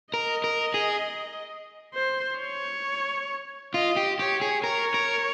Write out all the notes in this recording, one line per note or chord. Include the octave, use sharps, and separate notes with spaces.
A#4 D#5
A#4
G#4
C5
C#5
F4 D#5
G4
G4 C#5
G#4
A#4 C#5
A#4